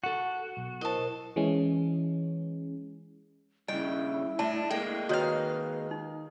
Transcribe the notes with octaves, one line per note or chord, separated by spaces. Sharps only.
F#4 A4 F#5
B1
E4 A#4 C5 D#5 A5
E3 G#3 C#4
G2 C#3 E4 D#5 G5
A2 D4 E5 A5
G#3 A#3 A4 G5
D#3 F#4 B4 C#5 D#5 F5
D#4